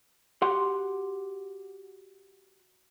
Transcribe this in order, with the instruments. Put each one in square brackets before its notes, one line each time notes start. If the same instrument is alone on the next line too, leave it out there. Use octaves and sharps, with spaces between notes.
[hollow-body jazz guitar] F#4 G4 F#5 C6